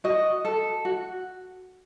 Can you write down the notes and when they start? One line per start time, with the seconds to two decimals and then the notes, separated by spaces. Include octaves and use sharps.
0.04 F#4 D#5
0.45 A4
0.85 F#4